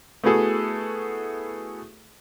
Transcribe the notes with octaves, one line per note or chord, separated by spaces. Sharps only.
A3 B3 E4 F#4 G#4 A4